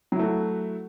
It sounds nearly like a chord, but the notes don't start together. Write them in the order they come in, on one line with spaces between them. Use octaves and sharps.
F#3 E4 A3 F#4